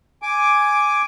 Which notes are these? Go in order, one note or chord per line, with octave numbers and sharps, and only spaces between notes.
G#5 D6